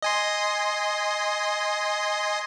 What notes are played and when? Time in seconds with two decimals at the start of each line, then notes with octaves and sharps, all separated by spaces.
0.02 D#5 G#5 C6